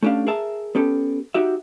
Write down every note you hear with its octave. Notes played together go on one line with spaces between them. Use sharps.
A3 C#4 D4 G4 F5
G#4 A#4 E5 A5
B3 C#4 G4 A4
D#4 F#4 G4 E5